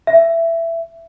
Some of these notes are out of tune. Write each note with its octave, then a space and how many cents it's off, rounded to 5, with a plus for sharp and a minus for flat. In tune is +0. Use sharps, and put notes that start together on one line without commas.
E5 +15